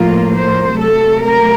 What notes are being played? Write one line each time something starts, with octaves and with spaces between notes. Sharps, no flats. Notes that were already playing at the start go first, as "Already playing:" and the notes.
Already playing: A2 F3 A#3 F4
C5
C3 F#3 A3 A4
A#4